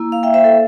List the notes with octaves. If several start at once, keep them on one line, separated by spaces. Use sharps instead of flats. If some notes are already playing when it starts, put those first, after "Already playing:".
Already playing: A#3 E4
F5
E5 G5
C5 E5
A4